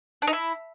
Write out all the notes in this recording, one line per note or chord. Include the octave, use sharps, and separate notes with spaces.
D4
D#4
E4